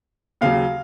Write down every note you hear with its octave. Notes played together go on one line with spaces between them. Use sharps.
D#2 C#3 F#3 F5